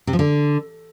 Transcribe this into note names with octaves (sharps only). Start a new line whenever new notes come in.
C3
F3
D3